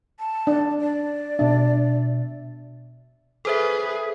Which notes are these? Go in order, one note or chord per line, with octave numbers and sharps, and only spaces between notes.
A5
D4
D5
B2 D4 E5
G#4 A4 B4 C5 E5